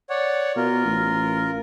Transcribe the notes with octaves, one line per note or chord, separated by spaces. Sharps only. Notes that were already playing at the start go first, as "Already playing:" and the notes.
C#5 D5 F#5
B2 F4 A#4
A1